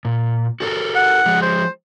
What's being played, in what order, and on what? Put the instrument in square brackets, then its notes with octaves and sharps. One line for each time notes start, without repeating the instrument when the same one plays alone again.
[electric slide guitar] A#2
F#4 A4 A#4
[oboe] F#5
[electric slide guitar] F3 G#3
[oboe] C5